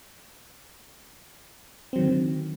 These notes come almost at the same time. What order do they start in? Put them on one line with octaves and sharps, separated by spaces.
C4 F#3 D#3 D3